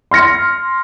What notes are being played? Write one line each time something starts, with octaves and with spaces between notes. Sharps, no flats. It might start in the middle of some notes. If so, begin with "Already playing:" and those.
C6 F6 A#6 C#7